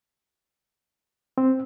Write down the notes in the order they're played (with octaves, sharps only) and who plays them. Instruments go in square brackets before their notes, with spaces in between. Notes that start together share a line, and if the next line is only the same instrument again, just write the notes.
[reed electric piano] C4